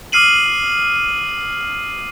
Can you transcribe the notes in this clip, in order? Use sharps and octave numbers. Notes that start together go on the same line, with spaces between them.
D6 D#6 F6 C7 D#7 F#7